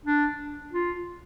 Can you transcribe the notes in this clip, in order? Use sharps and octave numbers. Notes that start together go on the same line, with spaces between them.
D4
F4